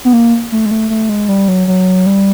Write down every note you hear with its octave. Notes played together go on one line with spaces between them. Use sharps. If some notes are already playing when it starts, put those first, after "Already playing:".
B3
A#3
A3
G#3
A3
A3
G#3
G3
F#3
F#3
G3